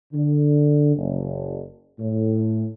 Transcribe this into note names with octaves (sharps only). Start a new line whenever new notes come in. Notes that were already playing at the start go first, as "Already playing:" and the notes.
D3
F#1
A2